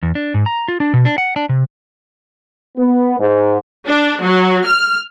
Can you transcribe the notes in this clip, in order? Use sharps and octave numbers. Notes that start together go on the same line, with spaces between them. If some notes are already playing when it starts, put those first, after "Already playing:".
E2
D4
G#2
A#5
F4
D4
B2
D4
F#5
D4
C3
B3
G#2
D4
F#3
F6